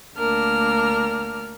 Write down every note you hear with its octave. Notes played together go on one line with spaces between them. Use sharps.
D2 A#3 D4 A#4 F6